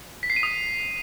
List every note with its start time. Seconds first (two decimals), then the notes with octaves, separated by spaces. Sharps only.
0.23 B6
0.30 C7
0.36 D#7
0.43 D#6